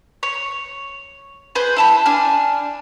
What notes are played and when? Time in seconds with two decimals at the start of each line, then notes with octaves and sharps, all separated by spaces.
0.23 C#5
1.55 G#4 B4 C5
1.76 E4 A5 B5
2.05 D4 G#5 F6